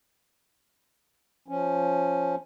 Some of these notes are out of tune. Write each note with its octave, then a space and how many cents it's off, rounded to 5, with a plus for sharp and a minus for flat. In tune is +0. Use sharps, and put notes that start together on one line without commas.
F3 +0 C#4 +0